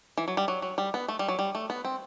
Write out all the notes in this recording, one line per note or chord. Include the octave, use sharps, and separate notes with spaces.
E3
F#3
G3
F#3
F#3
G3
B3
A3
G3
F#3
G3
A3
B3
C4